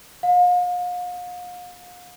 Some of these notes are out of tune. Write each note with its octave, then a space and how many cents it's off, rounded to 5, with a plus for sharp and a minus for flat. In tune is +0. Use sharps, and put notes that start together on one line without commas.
F5 +40